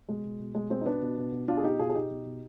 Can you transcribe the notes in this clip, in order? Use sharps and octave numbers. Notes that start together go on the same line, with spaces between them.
B2 G#3
B2
B2
B2 G#3
B2 G#3 C4
D#4
B2 B3 D4
B2
B2
B2
B2 D4 F4
G#4
B2 D#4 G4
B2 F4 G#4
G#4
B2 D#4 G4
B2
B2